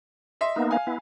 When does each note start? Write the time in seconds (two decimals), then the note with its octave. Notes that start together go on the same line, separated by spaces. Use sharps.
0.41 D#5 E5 C6
0.56 A#3 B3 D#4
0.71 F5 G#5
0.87 B3 E4